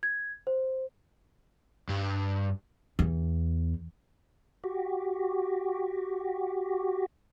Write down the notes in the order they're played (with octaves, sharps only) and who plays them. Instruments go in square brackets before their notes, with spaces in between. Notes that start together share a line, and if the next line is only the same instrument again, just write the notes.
[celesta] G#6
C5
[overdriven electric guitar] G2
[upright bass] E2
[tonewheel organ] F#4 G4